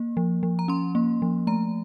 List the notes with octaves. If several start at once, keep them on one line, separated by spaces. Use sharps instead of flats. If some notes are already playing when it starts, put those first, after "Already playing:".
Already playing: A#3
F3
F3
A#5
C#4 C6
A#3
F3
A3 A#5